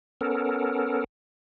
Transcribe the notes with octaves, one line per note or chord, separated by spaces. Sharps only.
B3 C#4 A4 A#4